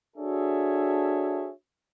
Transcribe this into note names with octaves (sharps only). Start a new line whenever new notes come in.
D4 F#4 G#4 A4 C#5 E5